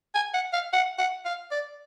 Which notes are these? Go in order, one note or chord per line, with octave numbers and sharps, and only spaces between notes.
G#5
F#5
F5
F#5
F#5
F5
D5